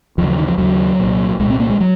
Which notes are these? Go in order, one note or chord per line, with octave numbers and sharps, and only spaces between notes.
D#2 C#3 F3
F3
D#3
F3
D#2 C#3 F#3
C2 A#2
C2 A#2 G#3
C4
A#3
G#3
F#3